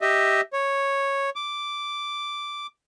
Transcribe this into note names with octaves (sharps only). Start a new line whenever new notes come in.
G4 D#5 E5
C#5
D6